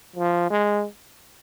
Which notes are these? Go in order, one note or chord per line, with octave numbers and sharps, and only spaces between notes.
F3
G#3